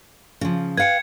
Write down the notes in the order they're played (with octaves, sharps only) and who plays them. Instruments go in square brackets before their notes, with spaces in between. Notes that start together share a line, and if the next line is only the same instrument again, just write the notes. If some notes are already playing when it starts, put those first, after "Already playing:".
[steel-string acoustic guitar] C#3 F3
[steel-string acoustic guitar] B4 F5 G5 [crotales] G#6 C#7